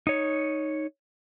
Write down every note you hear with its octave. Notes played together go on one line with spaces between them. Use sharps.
D#4 C#5